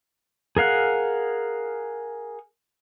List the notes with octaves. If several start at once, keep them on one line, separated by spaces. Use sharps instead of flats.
G#4 A#4 F5 F#5